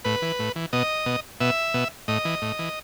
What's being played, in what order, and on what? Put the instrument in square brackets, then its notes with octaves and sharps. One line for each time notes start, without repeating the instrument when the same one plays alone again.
[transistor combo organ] A2 B4
E3
A2
E3
B2 D#5
B2
B2 E5
B2
A2 D#5
E3
A2
E3